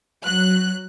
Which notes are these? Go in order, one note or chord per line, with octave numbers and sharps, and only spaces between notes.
F#3 F#6